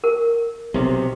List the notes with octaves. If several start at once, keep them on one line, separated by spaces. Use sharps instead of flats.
A#4
B1 C3